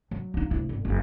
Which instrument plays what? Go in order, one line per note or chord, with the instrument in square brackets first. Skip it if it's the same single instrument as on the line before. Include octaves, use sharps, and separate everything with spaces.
[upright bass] F#3
A#3 D#4
F1 E4
G1
F#1